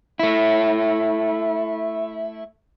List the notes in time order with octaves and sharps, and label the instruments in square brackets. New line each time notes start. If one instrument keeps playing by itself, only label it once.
[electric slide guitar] A3 E4